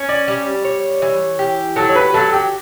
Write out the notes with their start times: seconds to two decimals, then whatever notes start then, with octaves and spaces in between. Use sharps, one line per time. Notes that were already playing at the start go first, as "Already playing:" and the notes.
Already playing: C#4
0.09 D5
0.28 G3
0.65 C#5
1.02 E3
1.39 G4
1.76 F#3 A4
1.89 C#5
1.96 B4
2.14 F#3 A4
2.33 G4